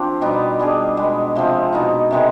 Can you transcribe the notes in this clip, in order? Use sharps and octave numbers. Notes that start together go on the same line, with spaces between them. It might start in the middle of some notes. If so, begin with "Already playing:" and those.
Already playing: F3 C4 D4 F4 G4
B2 G3 B3 D#4
G3 D4 G#4
B2 G#3 B3
C3 F3 C4
B2 B3 D#4
C3 D#3 G#3 B3